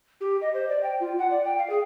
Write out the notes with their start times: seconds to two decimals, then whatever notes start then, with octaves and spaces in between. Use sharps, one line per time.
0.21 G4
0.41 D#5
0.54 C5
0.69 D5
0.83 G5
1.00 F4
1.19 F#5
1.31 D5
1.45 G5
1.58 F5
1.70 G#4